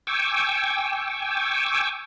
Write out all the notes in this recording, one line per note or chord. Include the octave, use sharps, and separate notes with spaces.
G5 G#5 C#6 D6 E6